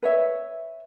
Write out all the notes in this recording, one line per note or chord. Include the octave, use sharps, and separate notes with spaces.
B4 C#5 E5